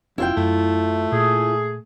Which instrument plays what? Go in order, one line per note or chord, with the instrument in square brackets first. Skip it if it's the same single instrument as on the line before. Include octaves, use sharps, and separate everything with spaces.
[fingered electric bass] F1 C#4 [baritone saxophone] F#2 [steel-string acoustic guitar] E4 F4 G5
[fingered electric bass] F#2 [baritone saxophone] A3
[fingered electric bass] A#2 [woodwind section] G#4